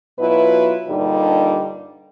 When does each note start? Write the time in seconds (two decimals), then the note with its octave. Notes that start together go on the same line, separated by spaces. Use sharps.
0.19 B2 F#3 E4 F4 B4
0.87 G2 A#2 D3 G3 D#4